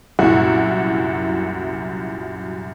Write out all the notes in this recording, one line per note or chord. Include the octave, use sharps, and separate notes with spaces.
C2 F#2 A#2 E4 F#4